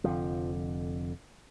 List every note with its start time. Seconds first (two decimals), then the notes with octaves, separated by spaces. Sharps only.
0.04 F1 F2 D3 F3